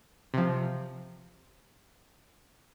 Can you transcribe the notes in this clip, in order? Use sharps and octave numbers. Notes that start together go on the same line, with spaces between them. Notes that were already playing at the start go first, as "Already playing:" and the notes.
C3 F3